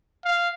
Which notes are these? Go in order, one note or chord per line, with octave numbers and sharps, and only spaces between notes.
F5